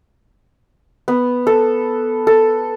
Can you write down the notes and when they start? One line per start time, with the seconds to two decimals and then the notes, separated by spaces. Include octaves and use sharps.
1.08 B3
1.47 A4
2.27 A4